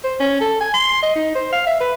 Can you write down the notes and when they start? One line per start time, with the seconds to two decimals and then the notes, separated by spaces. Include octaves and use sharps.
0.04 C5
0.20 C#4
0.41 A4
0.61 G#5
0.74 C6
1.03 D#5
1.16 D#4
1.35 C5
1.53 F5
1.67 E5
1.81 B4